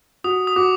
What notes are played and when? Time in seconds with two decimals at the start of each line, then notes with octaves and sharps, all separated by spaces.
0.24 F#4 D#6
0.47 D#6
0.56 F#4 D6